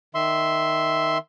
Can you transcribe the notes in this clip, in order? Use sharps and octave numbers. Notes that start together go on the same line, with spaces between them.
D#3 E5 C6